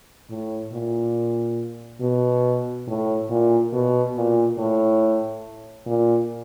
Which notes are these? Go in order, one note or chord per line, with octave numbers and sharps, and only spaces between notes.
A2
A#2
B2
A2
A#2
B2
A#2
A2
A#2